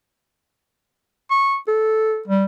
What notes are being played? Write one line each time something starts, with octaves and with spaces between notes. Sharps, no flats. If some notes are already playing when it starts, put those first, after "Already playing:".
C#6
A4
G3